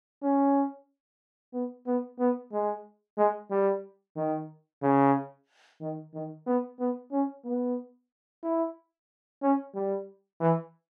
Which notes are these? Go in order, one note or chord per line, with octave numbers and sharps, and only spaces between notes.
C#4
B3
B3
B3
G#3
G#3
G3
D#3
C#3
D#3
D#3
B3
B3
C#4
B3
E4
C#4
G3
E3